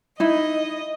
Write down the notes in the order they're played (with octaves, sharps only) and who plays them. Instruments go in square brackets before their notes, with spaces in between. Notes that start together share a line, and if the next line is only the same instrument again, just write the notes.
[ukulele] D#4 E4 [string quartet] D#5